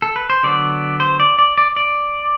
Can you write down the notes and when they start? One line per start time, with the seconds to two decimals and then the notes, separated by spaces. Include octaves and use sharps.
0.02 A4
0.16 B4
0.30 C5
0.43 D3 F#3 B3 D5
1.00 C5
1.20 D5
1.39 D5
1.58 D5
1.76 D5